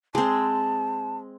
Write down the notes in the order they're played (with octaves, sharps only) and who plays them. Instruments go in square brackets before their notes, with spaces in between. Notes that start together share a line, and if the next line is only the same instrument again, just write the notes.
[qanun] G#3 C4 [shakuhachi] A5